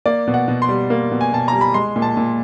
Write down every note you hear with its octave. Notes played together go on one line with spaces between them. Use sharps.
A#3 D5
B2
F#5
B2
C6
G3
A#3
B2
G#5
B2 A5
G3 A#5
B5
G#3 C6
A#2
A5
A#2